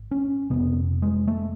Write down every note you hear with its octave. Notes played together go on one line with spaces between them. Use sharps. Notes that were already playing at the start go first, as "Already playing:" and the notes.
Already playing: G#1
C#4
F1 E2 C3 B3
G#3
A3